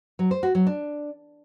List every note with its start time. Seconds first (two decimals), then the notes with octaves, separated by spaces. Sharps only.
0.19 F#3
0.31 C5
0.43 F#4
0.55 F#3
0.67 D4